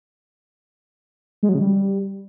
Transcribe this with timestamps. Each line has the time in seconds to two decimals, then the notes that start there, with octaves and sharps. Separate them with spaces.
1.43 G#3
1.49 F#3
1.55 C#3
1.61 G3